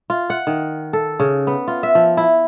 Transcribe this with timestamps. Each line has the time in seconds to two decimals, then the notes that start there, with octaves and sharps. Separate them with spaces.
0.10 F4
0.30 F#5
0.47 D#3
0.93 A4
1.20 C#3
1.47 B3
1.68 F4
1.83 E5
1.95 F3
2.17 E4